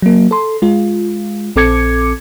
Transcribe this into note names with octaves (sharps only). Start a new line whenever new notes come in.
F#3 A#3
A4 C6
G#3 F4
A#1 C4 A4 D6 G#6 C#7